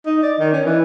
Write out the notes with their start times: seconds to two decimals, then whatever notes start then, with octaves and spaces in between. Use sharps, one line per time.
0.06 D#4
0.23 D5
0.39 D#3
0.53 C#4
0.66 E3